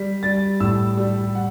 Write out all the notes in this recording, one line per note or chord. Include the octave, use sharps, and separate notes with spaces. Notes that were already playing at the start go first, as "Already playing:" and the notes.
Already playing: G3 B6
G3 A6
A2 E6
G3
F#5